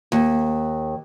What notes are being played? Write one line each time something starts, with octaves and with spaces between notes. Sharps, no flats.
D#2